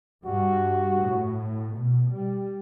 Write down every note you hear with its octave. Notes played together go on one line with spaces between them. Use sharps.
G2 F#4
A2
B2
G3